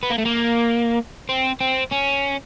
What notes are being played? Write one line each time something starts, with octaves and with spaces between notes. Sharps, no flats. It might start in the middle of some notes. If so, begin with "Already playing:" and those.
B3
A#3
A3
A#3
C4
C4
C#4